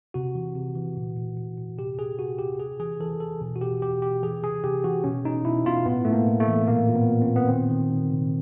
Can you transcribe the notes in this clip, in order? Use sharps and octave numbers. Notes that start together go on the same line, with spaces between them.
C3 F#4
E3
C3
E3
A#2
A#2
A#2
A#2
C3 G4
C3 G#4
C3 F#4
C3 G4
C3 G#4
E3 G#4
E3 A4
E3 A4
B2
F#4
B2 G4
B2 G4
B2 G4
E3 G#4
C3 G#4
C3 G4
E3 F#4
B2 C#4
B2 D#4
B2 E4
B2 F4
A2 B3
A2 A3
A#3
A2
A3
E3
A#2 A#3
A#2
B3
A#2
C4
A#2
B3
D#3 C4
D#3
D#3
C3